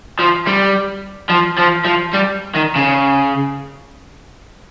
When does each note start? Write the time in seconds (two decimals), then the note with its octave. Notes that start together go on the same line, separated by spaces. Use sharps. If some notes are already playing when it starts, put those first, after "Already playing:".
0.19 F3
0.47 G3
1.30 F3
1.58 F3
1.86 F3
2.14 G3
2.55 D#3
2.76 C#3